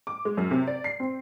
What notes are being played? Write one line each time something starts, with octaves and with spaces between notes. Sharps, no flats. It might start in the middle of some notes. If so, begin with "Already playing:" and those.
D6
G#3
F#2
C3
D5
C7
C4